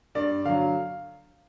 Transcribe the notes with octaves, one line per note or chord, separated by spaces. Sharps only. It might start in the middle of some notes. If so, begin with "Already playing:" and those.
G2 D5
D3 F#3 F5